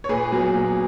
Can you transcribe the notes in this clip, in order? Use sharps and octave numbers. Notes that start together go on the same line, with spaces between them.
C#5
A#2 G#4 B4
F#3 B3
A#2